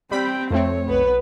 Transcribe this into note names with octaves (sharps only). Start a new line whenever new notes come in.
G3 C4 G5 B5
F2 A3 C4 C#5
B1 B3 B4